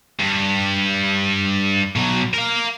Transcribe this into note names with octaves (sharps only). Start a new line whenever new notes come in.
G2
B2 F#3
A#4 F5